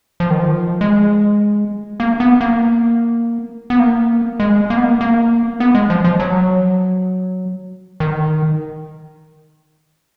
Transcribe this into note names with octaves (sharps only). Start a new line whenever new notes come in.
F3
D#3
F3
G#3
A#3
B3
A#3
B3
A#3
G#3
A#3
B3
A#3
A#3
B3
G#3
F3
F3
F#3
D#3